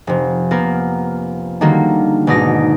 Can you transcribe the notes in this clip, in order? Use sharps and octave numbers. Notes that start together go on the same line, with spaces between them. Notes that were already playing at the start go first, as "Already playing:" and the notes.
F1 C3
A#3 B3 A#4
D3 D#3 G3 A#3 F#4
G#1 B2 D#4 D5 A#6